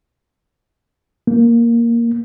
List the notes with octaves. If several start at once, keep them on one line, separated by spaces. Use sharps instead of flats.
A#3